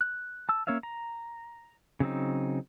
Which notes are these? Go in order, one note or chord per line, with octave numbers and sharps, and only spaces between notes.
F#6
A5 E6
A#3 C#4 C#5 E5 F5
A#5
C#3 F#3 C4 D#4